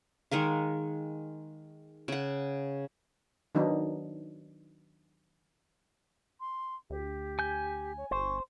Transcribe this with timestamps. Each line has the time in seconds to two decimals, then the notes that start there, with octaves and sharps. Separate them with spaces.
0.31 D#3 G#3 A#4 F5
2.08 C#3 F#5
3.55 D#3 F#3 B3 D4 D#4
6.40 C6
6.90 D2 G4
7.39 G#5 G6
7.98 C#5
8.11 G1 C5 C#6